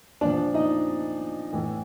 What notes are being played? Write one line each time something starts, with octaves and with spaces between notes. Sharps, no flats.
A#2 F3 D4 D5
D#4 D#5
A2 E3